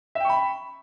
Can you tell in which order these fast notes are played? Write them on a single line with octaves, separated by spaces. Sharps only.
E5 G5 C#6 B5